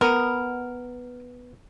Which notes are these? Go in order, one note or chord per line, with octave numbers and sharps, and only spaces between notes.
B3 A#4